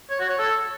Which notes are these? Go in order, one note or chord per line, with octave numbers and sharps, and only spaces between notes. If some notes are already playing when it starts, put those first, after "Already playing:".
C#5
F#4
C#5
A4